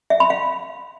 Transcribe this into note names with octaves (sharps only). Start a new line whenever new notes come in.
E5
B5
F5